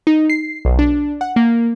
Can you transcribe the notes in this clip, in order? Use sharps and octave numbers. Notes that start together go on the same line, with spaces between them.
D#4
C7
B1
D4
F#5
A#3